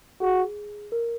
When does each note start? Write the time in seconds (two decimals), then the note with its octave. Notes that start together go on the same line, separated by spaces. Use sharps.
0.21 F#4 G#4
0.92 A#4